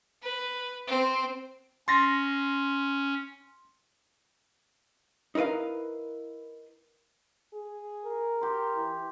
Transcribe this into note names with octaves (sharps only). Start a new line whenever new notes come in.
B4
C4
C#4 C6 A6 A#6
D#4 E4 A#4 B4 F5
G#4
A#4
G4 C6
E3